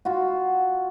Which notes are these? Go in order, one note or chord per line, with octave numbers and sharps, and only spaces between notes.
F4 F#4